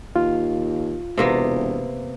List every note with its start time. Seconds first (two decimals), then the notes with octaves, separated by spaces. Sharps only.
0.16 D#2 F4
1.18 E1 C3 A#3 B3